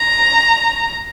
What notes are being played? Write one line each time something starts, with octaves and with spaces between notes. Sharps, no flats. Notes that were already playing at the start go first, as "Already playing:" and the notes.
Already playing: A#5